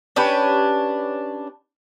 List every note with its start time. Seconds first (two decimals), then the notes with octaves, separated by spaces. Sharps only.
0.16 C#4 D4 G4 B4